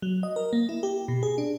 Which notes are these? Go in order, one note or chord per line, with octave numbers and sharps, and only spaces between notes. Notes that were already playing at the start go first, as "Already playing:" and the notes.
F#3
D#5
A#4
A#3
E4
G4
B2
G#4
D4